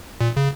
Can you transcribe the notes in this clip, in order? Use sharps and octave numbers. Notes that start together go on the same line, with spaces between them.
A#2
C#3